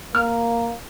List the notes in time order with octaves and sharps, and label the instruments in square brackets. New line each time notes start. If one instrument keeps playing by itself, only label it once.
[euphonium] A#3 [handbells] F6